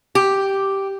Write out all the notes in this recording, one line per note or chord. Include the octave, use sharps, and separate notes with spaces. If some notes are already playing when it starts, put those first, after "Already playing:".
G4